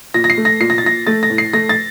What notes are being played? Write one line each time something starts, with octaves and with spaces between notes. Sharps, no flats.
A#2 A#6
A#6
C7
A3
A#6
A#2 C7
A#6
A6
A#2 A#6
A3 A6
A#6
A2
C7
A3 A#6
A6